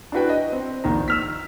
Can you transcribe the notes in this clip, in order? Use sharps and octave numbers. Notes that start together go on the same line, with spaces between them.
D4 E4 F#4 B4 G5
D#5
C4
A#1 D#3 A#5
E6 F6 B6